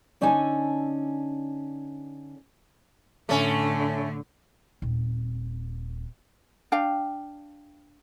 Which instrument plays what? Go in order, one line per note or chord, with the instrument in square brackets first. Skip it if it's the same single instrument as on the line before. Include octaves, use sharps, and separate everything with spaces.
[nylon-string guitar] D3 C#4 D#4 A4 G#5
[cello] A2 D3 [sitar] A3 C#4
[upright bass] D#1 C4
[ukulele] D4 F5 G5